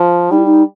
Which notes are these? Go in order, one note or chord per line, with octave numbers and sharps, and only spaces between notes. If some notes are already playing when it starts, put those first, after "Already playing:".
Already playing: F3
G3 D#4
E4
D#4